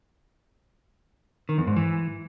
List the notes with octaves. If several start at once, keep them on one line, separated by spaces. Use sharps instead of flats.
D#3
E2
G#2
E3